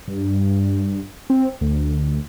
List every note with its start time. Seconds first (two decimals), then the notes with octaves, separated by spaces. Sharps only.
0.08 G2
1.30 C4
1.61 D2